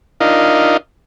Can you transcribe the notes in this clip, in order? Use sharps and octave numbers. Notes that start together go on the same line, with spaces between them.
D4 D#4 F4 A#4 D#5 F5